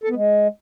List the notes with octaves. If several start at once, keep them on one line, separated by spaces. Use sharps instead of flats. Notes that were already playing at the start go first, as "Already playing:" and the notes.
A4
B3
G#3